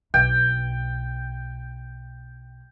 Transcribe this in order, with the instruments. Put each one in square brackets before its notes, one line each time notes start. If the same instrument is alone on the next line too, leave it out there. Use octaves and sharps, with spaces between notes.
[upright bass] B1 [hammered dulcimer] G5